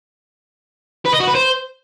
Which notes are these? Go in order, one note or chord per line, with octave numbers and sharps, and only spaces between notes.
B4
D#5
F#4
B4
C5